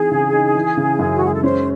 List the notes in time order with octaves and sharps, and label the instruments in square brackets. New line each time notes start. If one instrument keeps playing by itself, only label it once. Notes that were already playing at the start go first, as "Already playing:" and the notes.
Already playing: [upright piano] E3 C4 D#4 [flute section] G#4
[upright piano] C#3
D#4
E3
C#3
F#2
[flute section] F#4
[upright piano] G#3 [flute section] G#4
[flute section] A4
[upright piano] C#4 [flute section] C5